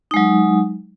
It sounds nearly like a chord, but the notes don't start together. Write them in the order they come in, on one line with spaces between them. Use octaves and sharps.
D#4 G#3 F#3